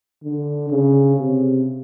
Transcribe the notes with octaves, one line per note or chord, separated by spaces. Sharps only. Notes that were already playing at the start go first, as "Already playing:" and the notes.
D3
C#3
C3